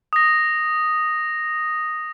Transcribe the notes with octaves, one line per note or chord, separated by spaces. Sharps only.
D#6 A#6